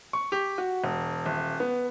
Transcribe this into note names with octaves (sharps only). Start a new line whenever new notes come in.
C#6
G4
F#4
E1
D#1
B3